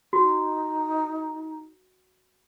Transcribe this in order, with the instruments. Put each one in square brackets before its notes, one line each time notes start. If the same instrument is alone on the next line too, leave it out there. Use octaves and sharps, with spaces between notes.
[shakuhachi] D#4 [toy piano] F#4